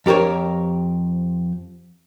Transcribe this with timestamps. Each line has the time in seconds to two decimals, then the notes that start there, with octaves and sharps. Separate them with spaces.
0.06 F2 G4 A#4 C5 C#5